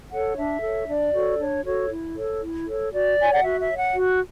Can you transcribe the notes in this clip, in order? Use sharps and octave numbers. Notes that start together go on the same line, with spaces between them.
A4 C#5 F#5
D4 E5
A4 C#5
D4 D5
F#4 A4 C#5
D4 C#5
F#4 A4 C#5
E4
A4 C#5
E4
A4 C#5
F#4 D5
C#5 G#5
F#5
F#4 E5
E5
C#5
F#5
F#4